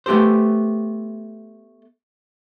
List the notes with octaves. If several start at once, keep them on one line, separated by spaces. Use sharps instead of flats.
A3 B3 G4 A4 C5